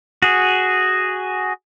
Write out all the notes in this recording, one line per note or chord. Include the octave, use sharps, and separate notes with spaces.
F#4 G#4